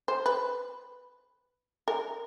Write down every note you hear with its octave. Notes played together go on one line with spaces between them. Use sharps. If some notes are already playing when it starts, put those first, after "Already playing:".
C5
B4
A#4